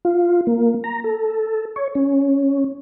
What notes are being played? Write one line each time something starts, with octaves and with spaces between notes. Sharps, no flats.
F4
A#3
A#5
A4
C#5
C#4